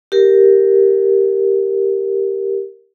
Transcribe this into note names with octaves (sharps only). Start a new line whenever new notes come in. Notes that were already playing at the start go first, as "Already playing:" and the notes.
G4 A#4